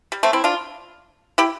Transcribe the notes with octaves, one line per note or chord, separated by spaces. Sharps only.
G3
A3 C4
C4 E4
D4 F4
E4 G4